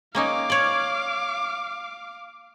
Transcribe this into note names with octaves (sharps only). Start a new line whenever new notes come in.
A#3 C#4 D#4 F5 D6
C#5 D5